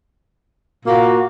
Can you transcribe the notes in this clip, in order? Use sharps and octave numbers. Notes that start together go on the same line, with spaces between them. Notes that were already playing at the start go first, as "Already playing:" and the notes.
A#2 A#3 F#4